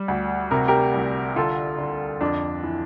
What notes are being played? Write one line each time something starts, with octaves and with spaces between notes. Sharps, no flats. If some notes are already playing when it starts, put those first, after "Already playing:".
Already playing: G3
D2
C3 A#4
G4 A#4
C2
D3 F4 A4
D3
F2 D4
E3